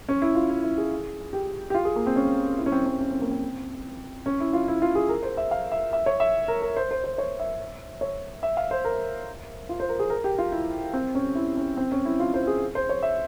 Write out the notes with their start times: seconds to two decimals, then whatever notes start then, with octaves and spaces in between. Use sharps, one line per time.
0.09 C#4
0.22 E4
0.35 F4
0.49 E4
0.63 E4
0.78 G#4
1.33 G4
1.70 G4
1.74 F4
1.85 G#4
1.96 A#3
2.07 C4
2.16 C#4
2.58 E4
2.66 C#4
2.72 C4
2.86 C#4
3.01 C#4
3.11 C4
3.21 A#3
3.31 C4
4.26 C#4
4.40 E4
4.53 F4
4.68 E4
4.82 F4
4.95 G#4
5.09 A#4
5.23 C5
5.37 E5
5.51 F5
5.72 E5
5.93 E5
6.06 C#5
6.20 E5
6.48 A#4
6.62 A#4
6.77 C5
6.91 C5
7.04 C5
7.18 C#5
7.40 E5
8.01 C#5
8.43 E5
8.57 F5
8.71 C5
8.85 A#4
9.69 F4
9.80 C5
9.89 A#4
9.99 G#4
10.10 A#4
10.24 G4
10.38 F4
10.52 E4
10.93 C4
11.15 C#4
11.35 E4
11.57 C#4
11.77 C4
11.92 C#4
12.05 E4
12.20 F4
12.34 C5
12.47 G#4
12.75 C5
12.89 C#5
13.03 E5